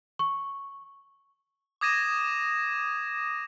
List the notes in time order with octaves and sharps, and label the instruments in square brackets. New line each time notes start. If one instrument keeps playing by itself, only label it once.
[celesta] C#6
[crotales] D6 D#6 G#6 A#6 D#7 E7